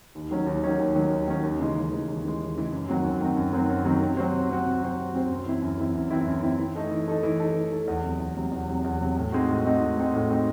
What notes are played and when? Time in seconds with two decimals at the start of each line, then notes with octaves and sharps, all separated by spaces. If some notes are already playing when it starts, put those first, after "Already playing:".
0.15 D#2
0.31 D#3 F#3 C#4
0.46 D#2
0.64 D#3 F#3 C#4
0.79 D#2
0.95 D#3 F#3 C#4
1.11 D#2
1.28 D#3 F#3 C#4
1.43 D#2
1.59 C#3 E3 G#3
1.76 D#2
1.92 C#3 E3 G#3
2.08 D#2
2.24 C#3 E3 G#3
2.40 D#2
2.56 C#3 E3 G#3
2.72 F#2
2.89 D#3 F#3 C4 F#4
3.04 F#2
3.21 D#3 F#3 C4 F#4
3.37 F#2
3.53 D#3 F#3 C4 F#4
3.69 F#2
3.85 D#3 F#3 C4 F#4
4.01 C3
4.17 F#3 C4 F#4 C5
4.33 C3
4.50 F#3 C4 F#4 C5
4.66 C3
4.81 F#3 C4 F#4 C5
4.98 C3
5.14 F#3 C4 F#4 C5
5.30 F#2
5.46 E3 C4 E4
5.62 F#2
5.78 E3 C4 E4
5.94 F#2
6.11 E3 C4 E4
6.26 F#2
6.43 E3 C4 E4
6.59 E3
6.75 A3 D#4 A4
6.91 E3
7.08 A3 D#4 A4
7.23 E3
7.40 A3 D#4 A4
7.55 E3
7.71 A3 D#4 A4
7.88 E2
8.03 C3 F#3
8.20 E2
8.36 C3 F#3
8.51 E2
8.68 C3 F#3
8.84 E2
9.01 C3 F#3
9.16 A2
9.32 G#3 C4 D#4 F#4
9.48 A2
9.65 G#3 C4 D#4 F#4
9.81 A2
9.97 G#3 C4 D#4 F#4
10.14 A2
10.30 G#3 C4 D#4 F#4